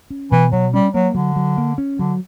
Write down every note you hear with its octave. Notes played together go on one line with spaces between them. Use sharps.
C#4
B2 E3
B2 F#3
G3 C#4
F#3 A#3
D3 F#3
F#3
A#3
C#4
D3 F#3